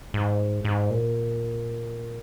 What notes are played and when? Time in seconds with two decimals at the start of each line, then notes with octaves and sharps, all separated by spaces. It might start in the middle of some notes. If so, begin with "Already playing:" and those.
0.14 G#2
0.65 G#2
0.90 A#2